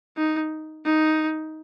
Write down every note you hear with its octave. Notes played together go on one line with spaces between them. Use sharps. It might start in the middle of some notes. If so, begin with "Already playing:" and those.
D#4
D#4